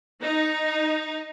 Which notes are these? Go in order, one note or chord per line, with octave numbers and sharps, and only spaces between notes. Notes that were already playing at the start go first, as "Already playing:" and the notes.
D#4